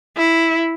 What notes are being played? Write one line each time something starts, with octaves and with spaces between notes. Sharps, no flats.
E4